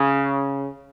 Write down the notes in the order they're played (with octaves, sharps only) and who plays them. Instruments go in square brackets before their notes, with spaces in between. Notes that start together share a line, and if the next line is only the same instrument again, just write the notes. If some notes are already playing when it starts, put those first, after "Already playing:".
Already playing: [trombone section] C#3